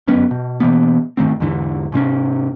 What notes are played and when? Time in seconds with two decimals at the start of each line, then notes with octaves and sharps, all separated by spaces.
0.08 G1 F#2 B3 C#4
0.31 B2
0.60 B2 E3 A#3 B3
1.17 G#2 D#3 A3 C4
1.40 E2 G#2 D3 E3
1.92 G#2 C3 C4 C#4